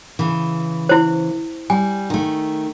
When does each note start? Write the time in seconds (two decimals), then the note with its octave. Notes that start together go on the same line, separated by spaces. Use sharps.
0.19 C#3 E3
0.89 E4 C5
1.70 G3 G#5
2.10 D#3 A3